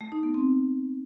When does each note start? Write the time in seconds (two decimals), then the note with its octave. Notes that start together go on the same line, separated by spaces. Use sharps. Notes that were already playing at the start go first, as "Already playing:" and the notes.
0.01 A3
0.12 D#4
0.23 B3
0.34 C4